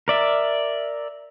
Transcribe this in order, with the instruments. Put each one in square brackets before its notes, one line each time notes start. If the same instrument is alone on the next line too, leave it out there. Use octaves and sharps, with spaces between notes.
[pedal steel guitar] A#4 D5 E5